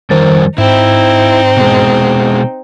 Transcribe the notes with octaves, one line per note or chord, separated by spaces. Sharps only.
F2 D#3 G3 A#4 C5 A6
G#2 C4 D#4 E4
B2 G#3